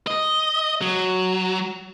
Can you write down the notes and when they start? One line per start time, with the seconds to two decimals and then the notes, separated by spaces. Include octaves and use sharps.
0.07 D#5
0.81 F#3